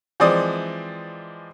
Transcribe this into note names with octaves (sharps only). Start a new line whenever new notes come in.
E3 F3 G#3 C4 D5 D#6